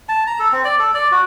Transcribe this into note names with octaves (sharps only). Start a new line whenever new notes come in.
A5
A#5
A4
C4
D5
A4
D5
F#4